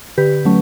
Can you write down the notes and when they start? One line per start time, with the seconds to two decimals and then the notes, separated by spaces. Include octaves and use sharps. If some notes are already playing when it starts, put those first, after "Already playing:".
0.18 D3 G4 B4
0.45 F#3 A3 C#4